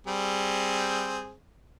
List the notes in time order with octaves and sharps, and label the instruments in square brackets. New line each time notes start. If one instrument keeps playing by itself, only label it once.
[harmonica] G3 C4 G#4